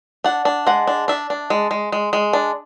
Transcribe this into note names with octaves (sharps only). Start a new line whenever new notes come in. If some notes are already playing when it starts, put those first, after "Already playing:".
D4 F#5
D4
G#3 F#5
D4
D4 E5
D4
G#3
G#3
G#3
G#3
D4